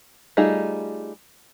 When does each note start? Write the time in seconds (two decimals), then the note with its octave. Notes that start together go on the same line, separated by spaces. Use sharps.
0.37 G3 A3 D#4 F4 G#4